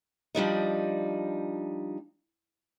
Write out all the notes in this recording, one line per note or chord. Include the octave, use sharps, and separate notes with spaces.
F3 G3 D4 D#4